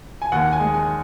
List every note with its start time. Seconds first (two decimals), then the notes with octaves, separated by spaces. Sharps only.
0.22 G#5
0.32 D#2 F#5
0.52 G#5
0.59 G#3
0.74 G#5